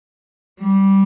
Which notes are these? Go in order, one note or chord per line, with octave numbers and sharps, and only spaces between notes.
G3